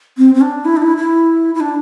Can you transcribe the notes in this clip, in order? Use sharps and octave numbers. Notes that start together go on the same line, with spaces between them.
C4
C4
D4
E4
D4
E4
E4
E4
D4